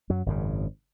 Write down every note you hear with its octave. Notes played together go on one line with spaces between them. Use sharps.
F#2 F#3
G#1 F#2 C#3